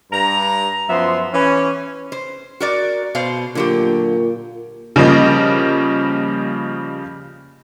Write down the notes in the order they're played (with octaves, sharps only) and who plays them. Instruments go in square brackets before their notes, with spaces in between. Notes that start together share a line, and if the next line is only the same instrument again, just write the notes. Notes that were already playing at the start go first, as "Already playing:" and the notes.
[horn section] G2 A#5
F#2 F3 B3 E5 C6
E3 C#4
[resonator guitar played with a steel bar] C5
F#4 A#4 D5
B2 C5 F5
[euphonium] A#2 [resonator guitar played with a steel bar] D3 F#3 G4
[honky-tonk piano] C#3 F3 G3 A#3 D#5